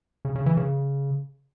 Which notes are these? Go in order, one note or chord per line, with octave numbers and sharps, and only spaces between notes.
C#3
C#3
E3
C#3